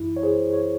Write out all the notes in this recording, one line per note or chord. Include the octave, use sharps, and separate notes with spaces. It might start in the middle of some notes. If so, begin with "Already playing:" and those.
Already playing: F#2 E3 E4
C#5
G#4 C5
C#5